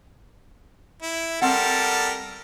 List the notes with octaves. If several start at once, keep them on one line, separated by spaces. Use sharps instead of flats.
E4
G3 C4 A4 A#4 F#5